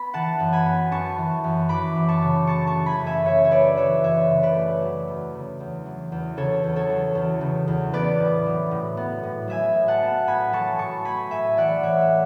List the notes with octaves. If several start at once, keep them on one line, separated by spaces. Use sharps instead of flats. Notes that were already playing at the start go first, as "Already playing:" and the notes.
Already playing: B3 B5
E3 F#5 A5
F#2
G#5 B5
B3
F#2 A5 C#6
E3
F#2
E3 B5 D6
F#2
A5 C#6
C#3
A3 A5 C#6
A5 C#6
E3
G#5 B5
F#2
E5 G#5
C#3 C#5 E5
C#5
A3 B4 D5
E3 C#5 E5
F#2 C#5 E5
C#3
B4 D5
A3
F#3
E2
C#3
E2
F#3
E2
C#3 A4 C#5
E2
A4 C#5
F#3
E2
C#3
E2
B3 B4 D5
A2
F#3
A2
B3
A2
F#3 E5 G#5
A2
F#5 A5
B3
A2 G#5 B5
F#3 A5 C#6
A2 A5 C#6
A3 G#5 B5
A2 E5 G#5
E3 D5 F#5
A2 C#5 E5
A3